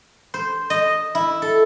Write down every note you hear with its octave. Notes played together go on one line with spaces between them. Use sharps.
C5
D#5
E4
A4